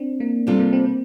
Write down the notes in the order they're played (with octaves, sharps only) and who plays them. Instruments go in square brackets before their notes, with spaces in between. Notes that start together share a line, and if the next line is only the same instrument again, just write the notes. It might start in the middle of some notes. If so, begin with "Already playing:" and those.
Already playing: [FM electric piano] C4 D4
A#3
[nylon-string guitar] C3 G3 D4 F4 A4 [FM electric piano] C4
[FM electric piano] A#3
C4
C4